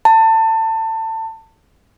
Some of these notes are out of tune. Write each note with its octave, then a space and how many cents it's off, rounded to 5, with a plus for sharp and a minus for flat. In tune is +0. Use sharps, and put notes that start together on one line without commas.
A5 +25